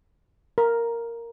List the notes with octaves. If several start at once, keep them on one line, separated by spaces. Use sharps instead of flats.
A#4